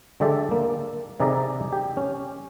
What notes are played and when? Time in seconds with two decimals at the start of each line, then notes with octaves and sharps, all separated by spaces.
0.20 D3 G#3 G4 D5 E5 A5
0.51 A#3
1.20 C3 D#4 G#4 D5 E5 A#5
1.73 G4
1.97 C#4